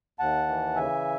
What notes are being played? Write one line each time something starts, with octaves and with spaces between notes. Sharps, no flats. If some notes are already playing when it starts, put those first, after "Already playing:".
D#2 F#5 A5
E3
C#3 E5 G#5